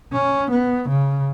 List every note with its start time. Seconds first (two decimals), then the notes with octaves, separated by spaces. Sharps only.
0.13 C#4
0.51 B3
0.89 C#3